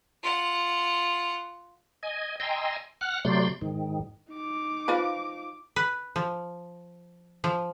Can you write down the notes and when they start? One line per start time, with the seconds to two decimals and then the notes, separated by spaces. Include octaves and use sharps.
0.23 F4 F#5
2.03 D#5 G#5
2.40 D#5 G5 G#5 A#5 C6 E6
3.01 F#5 F6 F#6
3.25 C3 F#3 A3 D5 C6 G6
3.61 G#2 D#3
4.32 D#4 D6
4.88 F3 F4 B4
5.76 B4
6.16 F3
7.44 F3